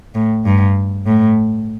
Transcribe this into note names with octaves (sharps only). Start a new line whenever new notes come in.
A2
G2
A2